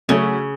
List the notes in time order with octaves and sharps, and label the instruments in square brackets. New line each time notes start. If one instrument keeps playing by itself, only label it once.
[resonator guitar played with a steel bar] C#3 [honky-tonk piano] F#3 A3 C#4